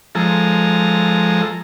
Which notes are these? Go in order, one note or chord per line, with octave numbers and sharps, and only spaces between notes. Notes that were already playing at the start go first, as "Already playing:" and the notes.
F3 G#3 A4 A#5